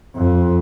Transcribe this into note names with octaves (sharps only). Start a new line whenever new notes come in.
F2